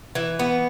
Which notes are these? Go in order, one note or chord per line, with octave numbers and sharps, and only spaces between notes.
E3
B3